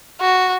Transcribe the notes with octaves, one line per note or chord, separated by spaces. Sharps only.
F#4